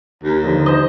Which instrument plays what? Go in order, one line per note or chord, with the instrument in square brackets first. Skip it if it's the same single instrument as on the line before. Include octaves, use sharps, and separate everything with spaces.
[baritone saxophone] D#2
[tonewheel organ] D3 F3 D#4
[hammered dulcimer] C5 D#5